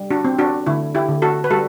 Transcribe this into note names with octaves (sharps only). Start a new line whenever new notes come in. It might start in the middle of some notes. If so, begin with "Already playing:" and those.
Already playing: G3
D4 F#4
C4
D4 F#4
D3 E4
E4 G4
D3
F#4 A4
B4
G3 F#4 A4